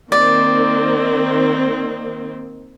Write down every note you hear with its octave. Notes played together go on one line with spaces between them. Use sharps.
D#3 A#3 C4 D5